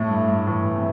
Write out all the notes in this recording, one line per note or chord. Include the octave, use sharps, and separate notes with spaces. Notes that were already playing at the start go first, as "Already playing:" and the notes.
Already playing: A2 A3
G2
G2
A2 E3
C3